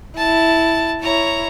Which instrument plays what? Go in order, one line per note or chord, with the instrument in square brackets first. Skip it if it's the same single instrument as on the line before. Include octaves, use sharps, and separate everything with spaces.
[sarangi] E4 [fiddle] A5
[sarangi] E4 [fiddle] C#5 A#5